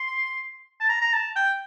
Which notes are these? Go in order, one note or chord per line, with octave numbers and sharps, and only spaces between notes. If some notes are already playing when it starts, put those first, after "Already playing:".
Already playing: C6
A5
A#5
A#5
A5
G5